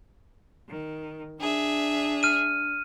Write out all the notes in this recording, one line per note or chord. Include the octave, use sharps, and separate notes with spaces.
D#3
D4 G#4 E5
F6 D#7